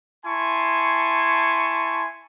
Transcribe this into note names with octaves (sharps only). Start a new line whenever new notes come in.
E4 G#5 A5 C6 C#6